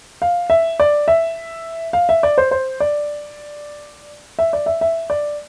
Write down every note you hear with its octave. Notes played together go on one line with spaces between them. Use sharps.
F5
E5
D5
E5
F5
E5
D5
C5
C5
D5
E5
D5
E5
E5
D5